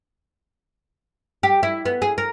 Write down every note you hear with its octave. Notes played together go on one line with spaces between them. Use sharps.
G4
E4
B3
G#4
A#4